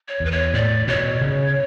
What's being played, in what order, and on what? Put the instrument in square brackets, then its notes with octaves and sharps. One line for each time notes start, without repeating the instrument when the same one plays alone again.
[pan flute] C#5
[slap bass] E2 [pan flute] B4
[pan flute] C#5
[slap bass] A2 [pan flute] D5
[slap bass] B2 [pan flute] C#5
[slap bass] C#3